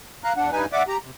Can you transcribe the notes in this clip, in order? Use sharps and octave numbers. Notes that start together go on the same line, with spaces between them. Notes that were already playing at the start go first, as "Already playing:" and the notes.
F5 A#5 F#6
E2 D4 F#5
G2 G3 D#4 B4 G#5
D5 E5 F#5 D6
G4 A#5
C3